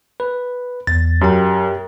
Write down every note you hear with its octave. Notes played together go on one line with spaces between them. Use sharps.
B4
E2 A6
F#2 G4 A#4 G5